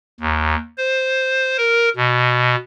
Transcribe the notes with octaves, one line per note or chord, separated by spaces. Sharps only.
D#2
C5
A#4
B2